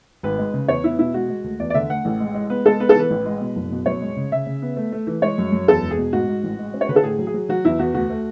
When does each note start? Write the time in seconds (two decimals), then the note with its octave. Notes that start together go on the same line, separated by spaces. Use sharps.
0.23 G#1 B4
0.38 G#3
0.54 C#3
0.68 E2 C#5
0.84 B3 E4
0.99 B2 E4
1.14 G#3 F#4
1.30 G#3
1.44 D2
1.59 E2 D5
1.70 D5
1.74 D3 E5
1.90 A3 F#5
2.05 A1
2.20 G#3
2.35 G#3
2.50 B3 B4
2.66 G#3 A4
2.80 B3 B4
2.89 A4
2.95 E3 B4
3.10 A1
3.26 G#3
3.41 B2
3.56 F#1
3.71 B2
3.86 F#2 C#5
4.01 G#3
4.16 C#3
4.32 C#3 E5
4.47 C#3
4.62 B3
4.77 A3
4.92 A3
5.07 E3
5.22 G#3 C#5
5.38 F#2
5.52 F#2
5.68 E2 A4
5.83 E1
5.91 G#4
5.98 B2
6.13 G#2 F#4
6.28 G#2
6.44 A1
6.59 G#3
6.74 C#4
6.81 C#5
6.89 D3 B4
6.96 A4
7.04 A2 G#4
7.19 F#3
7.27 G#4
7.34 F#3
7.49 F#3 F#4
7.65 E2 E4
7.79 E2 F#4
7.94 D2 F#4
8.10 A3